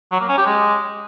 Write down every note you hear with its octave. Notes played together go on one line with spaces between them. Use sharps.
F#3
A#3
C#4
G4
G#3